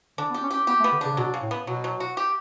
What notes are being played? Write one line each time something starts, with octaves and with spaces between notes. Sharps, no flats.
D3 D4
B3
G4
C#4
G4
C#4
B3 G4
A3
B3
D3
C#3 D4
C#3
B2 F#3
C#3
A2
B3
B2 F#3
F#3
F#4
G4